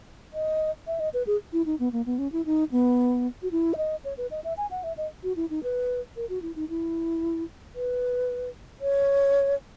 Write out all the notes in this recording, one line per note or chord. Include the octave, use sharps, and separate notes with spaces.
D#5
E5
D#5
B4
G#4
E4
D#4
B3
A#3
B3
C#4
E4
D#4
B3
F#4
E4
E5
D#5
C#5
B4
D#5
E5
G#5
F#5
E5
D#5
F#4
E4
D#4
B4
A#4
F#4
E4
D#4
E4
B4
C#5